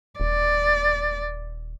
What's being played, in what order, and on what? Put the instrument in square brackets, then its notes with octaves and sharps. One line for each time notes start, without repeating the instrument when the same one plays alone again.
[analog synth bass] D#1 [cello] D5